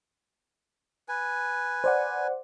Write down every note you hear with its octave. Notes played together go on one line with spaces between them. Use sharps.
B4 G#5
C5 D5 F#5